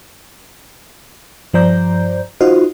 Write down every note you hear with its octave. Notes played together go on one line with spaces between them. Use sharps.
G2 F3 C5 D5 A#5 G6
D#4 F4 F#4 C5 D#5 F5